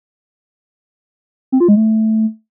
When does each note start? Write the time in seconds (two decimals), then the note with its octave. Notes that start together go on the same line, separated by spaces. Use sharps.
1.52 C4
1.60 F4
1.68 G#3
1.76 A3